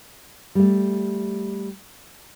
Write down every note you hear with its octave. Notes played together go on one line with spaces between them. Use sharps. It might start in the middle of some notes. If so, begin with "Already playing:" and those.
G3 A3